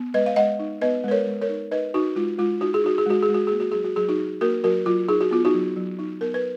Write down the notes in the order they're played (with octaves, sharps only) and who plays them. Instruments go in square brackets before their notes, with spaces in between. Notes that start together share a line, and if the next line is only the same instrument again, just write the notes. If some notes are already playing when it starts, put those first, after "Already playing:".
Already playing: [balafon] B3
G#3 B4 D#5
F5
G#3 D#5 F#5
D#4
B3 B4 D#5
G#3 B4
A#4 C#5
G#3
A#4 C#5
D#4
D#4 B4 D#5
D#4 F#4
G#3 F4
G#3 F4
D#4 F#4
G#4
D#4 F#4
G#4
G#3 F#4
G#4
G#3
F#4
A#3 G#4
F#4
F#3 G#4
F#4
F#3 G#4
D#4 F#4
D#4
A#3 F#4 A#4
F#3 F#4 A#4
F#3 F4
D#4 G#4
F#4
B3 F4
D#4 F#4
F#3
F#3
D#4
B3 A#4
B4